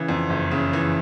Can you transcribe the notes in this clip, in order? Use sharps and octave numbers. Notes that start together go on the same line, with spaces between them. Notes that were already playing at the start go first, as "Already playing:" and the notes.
Already playing: C#3 E3
F2
F#1
C#3
E3